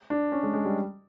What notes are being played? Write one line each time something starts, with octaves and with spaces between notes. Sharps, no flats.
D4
C#4
G#3
G#3
G3